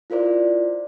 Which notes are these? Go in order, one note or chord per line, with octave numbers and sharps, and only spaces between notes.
E4 F4 A#4 C5 D5